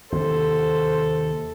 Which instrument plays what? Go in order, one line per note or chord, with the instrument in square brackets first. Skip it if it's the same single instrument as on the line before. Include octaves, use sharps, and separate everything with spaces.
[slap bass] D#2 C3 [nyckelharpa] A4 [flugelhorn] C5